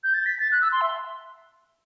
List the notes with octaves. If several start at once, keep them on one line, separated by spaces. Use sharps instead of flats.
G6
A6
B6
A6
F#6
E6
C6
E5